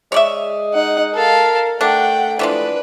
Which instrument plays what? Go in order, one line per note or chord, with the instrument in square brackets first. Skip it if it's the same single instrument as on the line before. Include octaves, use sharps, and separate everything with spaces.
[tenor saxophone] G#3 [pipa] C#5 D5 E5
[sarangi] D#4 [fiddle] F#5
[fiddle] A4 F5 [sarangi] A#4
[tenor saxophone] A3 [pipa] D4 [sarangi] F#5 [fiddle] G5
[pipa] E3 F3 G#3 [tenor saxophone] A3 [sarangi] D4 [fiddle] B4